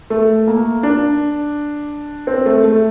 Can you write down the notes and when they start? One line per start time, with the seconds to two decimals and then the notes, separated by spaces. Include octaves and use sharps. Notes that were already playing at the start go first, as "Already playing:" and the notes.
0.10 A3
0.47 A#3
0.83 D4
2.27 C4
2.46 A3
2.64 A3